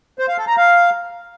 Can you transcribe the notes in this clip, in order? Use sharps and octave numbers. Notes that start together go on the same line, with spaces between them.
C5
F5
A4
A#5
F5